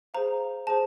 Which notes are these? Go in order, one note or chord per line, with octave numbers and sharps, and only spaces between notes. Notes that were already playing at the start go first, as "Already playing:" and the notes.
G#4 C5 F5 A#5
G#4 C5 A5